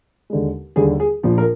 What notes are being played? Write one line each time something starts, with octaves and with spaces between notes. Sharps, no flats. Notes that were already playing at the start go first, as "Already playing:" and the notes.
D#2 D3 G#3
D#2 D3 G3 G#4
G#4
A#1 A#2 F3
A#4